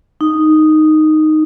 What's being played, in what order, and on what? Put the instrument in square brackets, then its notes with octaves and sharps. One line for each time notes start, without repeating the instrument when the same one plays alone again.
[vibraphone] D#4